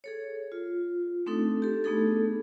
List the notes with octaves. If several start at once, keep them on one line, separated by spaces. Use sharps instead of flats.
G#4 A4 C#5
F4
A3 C4 D4 D#4 A4
G4 A4
A3 B3 D4 D#4 G#4 A4